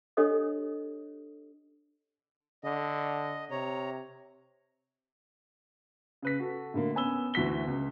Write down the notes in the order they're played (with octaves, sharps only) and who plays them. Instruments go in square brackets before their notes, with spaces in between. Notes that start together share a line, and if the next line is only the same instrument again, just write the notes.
[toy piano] D4 G4 A4 C#5 D#5 D#6
[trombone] D3 [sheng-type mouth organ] D#5
[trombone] C3 [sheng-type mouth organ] C#5 A#5
[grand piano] C#3 B4 B6
F#4 A4
A2 D3 A#3
B3 C#4 G#5 B5 E6 G7
D2 E3 F#4 B6 G7
C#2